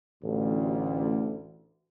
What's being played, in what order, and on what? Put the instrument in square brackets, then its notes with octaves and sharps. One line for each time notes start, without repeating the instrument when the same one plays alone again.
[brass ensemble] A1 D2